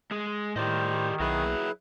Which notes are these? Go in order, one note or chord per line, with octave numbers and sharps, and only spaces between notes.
G#3 G#4
A2 D#3 G4 C5 D5 D#5
B1 F#3 E4 G#4 B4